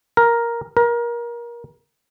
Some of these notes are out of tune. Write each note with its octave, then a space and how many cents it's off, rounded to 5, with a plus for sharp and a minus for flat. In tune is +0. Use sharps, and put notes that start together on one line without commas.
A#4 +5
A#4 +25